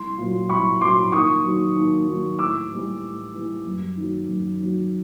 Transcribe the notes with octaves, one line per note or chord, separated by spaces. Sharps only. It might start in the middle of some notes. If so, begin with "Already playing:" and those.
Already playing: C2 C6
A#2 F#3
C2 B5 C#6
A#2 F#3 C6 D6
D#2 C#6 D#6
D#3 F#3
D#2
D#3 F#3
A2 D6 E6
E3 G3
A2
E3 G3
F#2
D#3 F#3
F#2
D#3 F#3